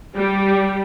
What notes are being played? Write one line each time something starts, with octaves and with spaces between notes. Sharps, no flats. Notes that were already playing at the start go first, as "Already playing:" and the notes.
G3